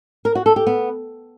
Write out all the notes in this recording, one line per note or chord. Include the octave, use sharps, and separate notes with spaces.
A#4
F#4
A4
G4
B3